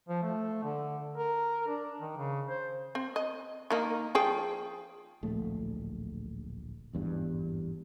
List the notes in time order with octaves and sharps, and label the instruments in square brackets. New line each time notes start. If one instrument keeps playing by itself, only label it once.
[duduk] F3
A3
D3
A#4
D4
D#3
C#3
C5
[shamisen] C4
D#5
D#3 A#3 D#4
F3 G#4 G5
[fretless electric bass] D1 A#1 A3
G#1 E2 G2